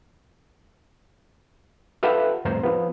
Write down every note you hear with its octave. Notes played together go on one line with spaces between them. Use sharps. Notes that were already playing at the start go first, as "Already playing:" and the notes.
F4 G4 A4 B4 E5 F#5
C2 F2 A2 C5 A#5 C6
F3 B3